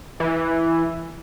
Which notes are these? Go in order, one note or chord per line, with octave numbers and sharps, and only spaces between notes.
E3